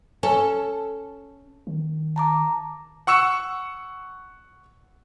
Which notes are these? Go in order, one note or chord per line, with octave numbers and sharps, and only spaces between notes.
C#4 A4
D#3
A5 A#5 D6
F#5 C#6 E6 C#7 E7